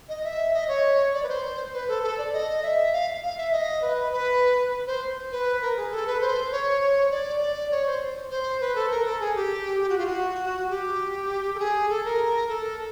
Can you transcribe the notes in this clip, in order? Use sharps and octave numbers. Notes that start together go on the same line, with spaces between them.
D#5
E5
D#5
C#5
D5
B4
C5
B4
A4
A4
D5
D#5
E5
F5
F5
E5
D#5
B4
B4
C5
B4
A#4
G#4
A4
B4
C5
C#5
D5
D5
C#5
C5
C5
B4
A4
A#4
A4
G#4
G4
G4
F#4
F4
F#4
G4
A4
G#4
A4
A#4
A4